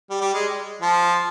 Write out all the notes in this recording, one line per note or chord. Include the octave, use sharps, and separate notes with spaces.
G3
G3
G#3
F3